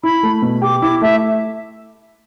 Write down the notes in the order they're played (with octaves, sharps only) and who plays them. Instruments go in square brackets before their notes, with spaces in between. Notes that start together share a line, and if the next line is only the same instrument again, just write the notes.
[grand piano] E4 [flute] B5
[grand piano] A3
B2
[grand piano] G4 [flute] D6
[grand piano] E4 [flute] D6
[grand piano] A3 [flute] E5